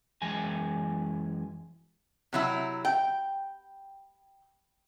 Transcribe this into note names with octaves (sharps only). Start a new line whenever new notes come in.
F#2 E3 G#3 G#5
C3 F#3 E4
G5